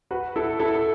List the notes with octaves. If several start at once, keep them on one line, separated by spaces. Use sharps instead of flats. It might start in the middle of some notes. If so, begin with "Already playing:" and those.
F#4 B4
E4 A4
E4 A4
A4